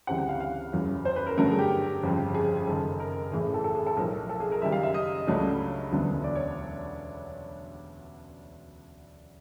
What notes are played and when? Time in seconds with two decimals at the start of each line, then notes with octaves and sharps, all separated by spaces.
0.07 D2 C#3 E3 G3 C4 F#5
0.18 F#5
0.29 F5
0.40 F5
0.73 F#1 E2 C#3 F#3
1.05 C5
1.16 B4
1.26 A#4
1.37 G2 D3 F#3 A3 A#4
1.48 G#4
1.59 G4
2.03 G1 F2 C#3 F3
2.34 G#4
2.57 G#4
2.67 F#1 F#2 D#3 A4
3.00 A#4
3.32 A1 A2 E3 A3 G#4
3.44 G#4
3.54 A4
3.64 A4
3.75 G#4
3.87 A4
3.97 B1 A2 F3 A#4
4.29 A4
4.40 G#4
4.52 A#4
4.62 F#1 F#2 D#3 G3 E5
4.72 F5
4.83 E5
4.94 D#5
5.27 C#2 C#3 F#3 A3 D4
5.92 E1 D2 D3 F#3 B3
6.24 D5
6.35 C#5